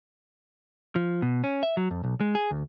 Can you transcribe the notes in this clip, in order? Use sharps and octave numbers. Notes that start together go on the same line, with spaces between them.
F3
B2
C#4
E5
F#3
F2
B1
G#3
G#4
D2